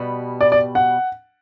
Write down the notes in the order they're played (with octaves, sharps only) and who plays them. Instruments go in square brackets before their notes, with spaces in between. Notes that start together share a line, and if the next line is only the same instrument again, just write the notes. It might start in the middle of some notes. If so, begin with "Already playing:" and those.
Already playing: [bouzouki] B2 G3 B3
[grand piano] D5
D5
F#5